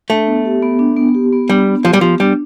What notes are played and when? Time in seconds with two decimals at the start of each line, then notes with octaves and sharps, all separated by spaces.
0.10 A3 D4
0.27 B3
0.45 G4
0.63 B3
0.79 D4
0.97 B3
1.15 G4
1.32 B3
1.49 G3 D4
1.67 B3
1.85 F3 G4
1.93 G3
2.01 F3 B3
2.20 G3 D4